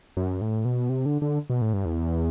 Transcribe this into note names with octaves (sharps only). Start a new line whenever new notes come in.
F#2
A2
B2
C3
D3
D3
B2
A2
G2
E2